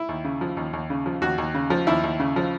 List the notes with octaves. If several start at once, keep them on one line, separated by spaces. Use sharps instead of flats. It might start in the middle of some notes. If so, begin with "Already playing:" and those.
Already playing: E4
D#2
C#3
F3
D#2
D#2
C#3
F3
D#2 F#4
D#2
C#3
F3
D#2 E4
D#2
C#3
F3